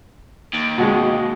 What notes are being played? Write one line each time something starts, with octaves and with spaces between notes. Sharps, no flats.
D#2
B2 G#3